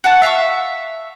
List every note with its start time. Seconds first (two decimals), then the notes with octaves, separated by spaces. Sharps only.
0.04 F#4 F#5 A5
0.22 E5 F5 A5 C#6